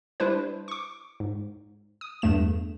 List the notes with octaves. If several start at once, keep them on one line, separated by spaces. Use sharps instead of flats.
G3 D4 E4 B4 C5
C#6 D6
G#2
D#6
E2 G2 A3 E7